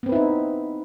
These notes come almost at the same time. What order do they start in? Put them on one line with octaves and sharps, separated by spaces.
B3 C4 B4 E4 D#4